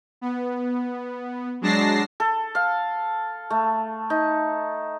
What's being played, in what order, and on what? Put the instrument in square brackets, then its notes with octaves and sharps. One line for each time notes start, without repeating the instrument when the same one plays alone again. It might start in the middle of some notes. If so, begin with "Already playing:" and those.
[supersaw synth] B3
F#3 G#3 D4 A5 A#6 C7
[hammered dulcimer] A4
F5
A3
D#4